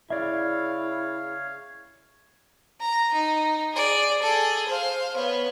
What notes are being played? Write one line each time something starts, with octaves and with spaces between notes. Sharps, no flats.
C#3 E4 C#5 D5 E5 F5
A#5
D#4
G#4 D5
G#4 A4
C5 F5
B3 C#5